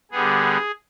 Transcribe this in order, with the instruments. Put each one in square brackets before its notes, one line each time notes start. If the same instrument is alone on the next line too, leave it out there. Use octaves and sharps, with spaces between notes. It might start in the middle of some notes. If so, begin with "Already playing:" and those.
[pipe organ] D3 G3 B3 G#4